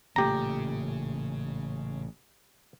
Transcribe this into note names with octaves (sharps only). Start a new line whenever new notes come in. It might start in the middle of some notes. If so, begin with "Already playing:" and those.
A1 A#2 C#3 A3 G4 A#5